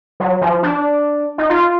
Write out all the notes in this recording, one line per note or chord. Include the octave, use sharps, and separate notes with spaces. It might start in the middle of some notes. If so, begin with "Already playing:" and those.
F#3
F3
D4
D#4
F4